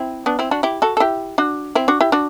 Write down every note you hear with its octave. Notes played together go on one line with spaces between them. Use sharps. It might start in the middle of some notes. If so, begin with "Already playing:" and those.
Already playing: C4 E4
B3 D4
C4 E4
D4 F#4
E4 G4
F#4 A4
A4
E4 G4
D4 F#4
C4 E4
D4 F#4
E4 G4
D4 F#4